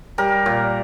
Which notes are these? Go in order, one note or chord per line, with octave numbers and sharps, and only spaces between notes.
G3 A#4
A#2